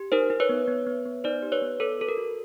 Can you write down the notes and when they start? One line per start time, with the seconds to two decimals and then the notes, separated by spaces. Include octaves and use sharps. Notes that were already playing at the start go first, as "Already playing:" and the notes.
Already playing: G4
0.12 D#4 A#4 C5
0.30 D#4
0.40 B4 C#5
0.49 B3
0.68 B3
0.86 B3
1.06 B3
1.24 D#4 C5 D5
1.42 G4
1.52 B4 C#5
1.62 B3
1.80 A4 B4
1.99 F#4 A4
2.09 A#4
2.17 F#4